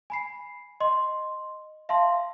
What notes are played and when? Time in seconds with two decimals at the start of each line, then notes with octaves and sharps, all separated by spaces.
0.10 G#5 B5 C7
0.80 D#5 C6
1.89 E5 F5 A5 C6